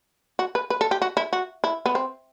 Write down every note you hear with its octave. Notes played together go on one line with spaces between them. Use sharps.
F#4
B4
B4
A4
G4
F#4
E4
F#4
E4
B3
C4